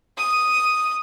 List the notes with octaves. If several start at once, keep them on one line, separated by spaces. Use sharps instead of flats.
D#6